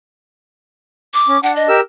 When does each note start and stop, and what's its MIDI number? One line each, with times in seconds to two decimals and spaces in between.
1.14 1.40 86
1.28 1.37 61
1.43 1.68 62
1.43 1.54 78
1.56 1.77 75
1.69 1.80 67
1.69 1.80 70
1.69 1.80 88